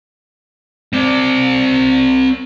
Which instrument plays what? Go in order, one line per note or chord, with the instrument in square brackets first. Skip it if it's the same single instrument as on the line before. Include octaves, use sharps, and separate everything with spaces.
[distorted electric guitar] C4 D5